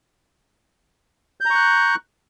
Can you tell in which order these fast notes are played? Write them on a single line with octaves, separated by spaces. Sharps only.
G6 A#5 C#6 F#6